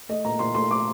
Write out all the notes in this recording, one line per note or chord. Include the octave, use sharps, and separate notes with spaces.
A3 D#5
A#2 A#5
A#2 C6
A3 C6
A3 D6